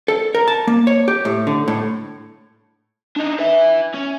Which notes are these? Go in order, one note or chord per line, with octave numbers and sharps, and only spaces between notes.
A4
A#4
A5
A#3
C#5
G4
A2
D3
A2
D4 D#4
B4 E5
C#4